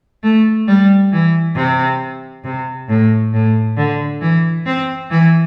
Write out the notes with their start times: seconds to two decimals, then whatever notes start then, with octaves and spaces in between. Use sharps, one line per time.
0.23 A3
0.68 G3
1.12 E3
1.56 C3
2.44 C3
2.89 A2
3.33 A2
3.77 D3
4.21 E3
4.66 C4
5.10 E3